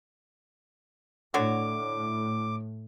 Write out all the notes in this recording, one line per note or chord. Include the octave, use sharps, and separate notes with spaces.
A2 D3 F#4 C#5 D6